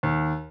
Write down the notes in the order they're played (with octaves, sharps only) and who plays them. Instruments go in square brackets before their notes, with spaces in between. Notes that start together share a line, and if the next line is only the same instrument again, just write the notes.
[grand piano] D#2